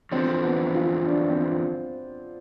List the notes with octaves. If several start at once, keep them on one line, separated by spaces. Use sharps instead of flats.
E2 D3 F3 C4
B3
F4
D4
C4